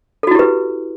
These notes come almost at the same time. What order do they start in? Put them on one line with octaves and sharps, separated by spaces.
A4 F#4 E4 G4 B4